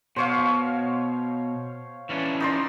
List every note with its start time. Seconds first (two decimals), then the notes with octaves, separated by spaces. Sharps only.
0.16 B2 C5 C#5 F5
2.09 E3 C#4 D4
2.40 D#4 D5 C6